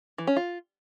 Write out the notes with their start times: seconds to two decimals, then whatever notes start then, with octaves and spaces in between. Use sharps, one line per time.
0.18 E3
0.27 C#4
0.36 F4